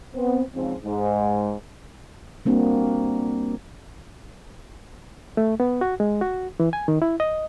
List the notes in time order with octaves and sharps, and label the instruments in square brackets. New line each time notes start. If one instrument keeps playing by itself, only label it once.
[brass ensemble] B3 C4
G#2 C#3 F3 C4
G#2
[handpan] G3 A#3 C4 D4 F#4
[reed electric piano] A3
B3
F#4
G#3
F#4
E3
G#5
D#3
E4
D#5